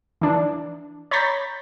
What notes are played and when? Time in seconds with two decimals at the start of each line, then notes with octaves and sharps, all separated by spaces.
0.21 E3 D4
1.11 C#5 A#5 B5 G6 A6 B6